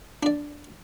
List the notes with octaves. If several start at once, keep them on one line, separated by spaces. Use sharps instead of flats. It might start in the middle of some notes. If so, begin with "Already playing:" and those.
D4 D5